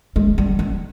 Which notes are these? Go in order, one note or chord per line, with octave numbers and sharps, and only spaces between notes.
G#3
G3
G3